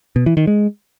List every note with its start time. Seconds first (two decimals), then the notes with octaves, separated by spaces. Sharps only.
0.16 B2
0.26 E3
0.37 D#3
0.47 G#3